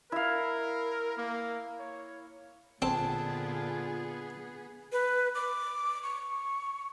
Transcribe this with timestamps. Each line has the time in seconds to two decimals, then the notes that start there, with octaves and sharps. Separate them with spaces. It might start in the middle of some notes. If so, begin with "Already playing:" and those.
0.12 E4 A#4 F5
1.17 A#3
1.80 C#5
2.82 A#2 D3 B3 C4 F4 G#4 A5
4.92 B4
5.35 D6
6.03 C#6